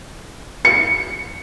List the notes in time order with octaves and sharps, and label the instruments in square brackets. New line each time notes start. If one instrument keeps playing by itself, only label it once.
[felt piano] C#7